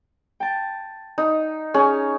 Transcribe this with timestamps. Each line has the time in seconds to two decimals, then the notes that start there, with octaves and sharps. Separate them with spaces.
0.40 G5 A5
1.18 D#4
1.74 C#4 G#4